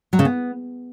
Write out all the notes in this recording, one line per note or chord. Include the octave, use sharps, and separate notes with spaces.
F#3
C#3
B3